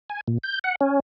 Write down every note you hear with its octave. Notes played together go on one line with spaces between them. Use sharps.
G#5
A#2
G6
F#5
C#4